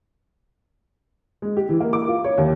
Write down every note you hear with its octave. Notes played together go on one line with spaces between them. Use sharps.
G#3
G4
E3
A#3
D6
F4
C#5
D#2